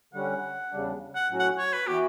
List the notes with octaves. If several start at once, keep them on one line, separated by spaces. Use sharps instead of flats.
D3 G3 C#4 F#5
E2 C#3 G3 D4
F#5
A2 F#3 C#4 F#4
F#5
C#5
B4
E3 B3 F#4 G4